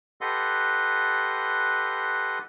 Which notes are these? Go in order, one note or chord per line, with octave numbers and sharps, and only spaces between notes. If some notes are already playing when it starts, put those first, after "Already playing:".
G4 A4 B4 D#5 F#5 C6